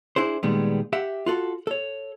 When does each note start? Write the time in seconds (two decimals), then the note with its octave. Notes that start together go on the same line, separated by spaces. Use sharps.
0.16 D4 E4 G#4 C5
0.43 A#2 D#3 G3 G#3 B3
0.93 G4 E5 F#5
1.26 F4 F#4 A4
1.67 A4 C#5